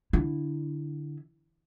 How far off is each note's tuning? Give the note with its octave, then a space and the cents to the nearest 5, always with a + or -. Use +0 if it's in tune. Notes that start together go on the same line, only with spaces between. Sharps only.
D3 +0 E4 +0